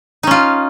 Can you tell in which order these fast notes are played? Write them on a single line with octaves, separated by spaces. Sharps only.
D#4 C#4 F4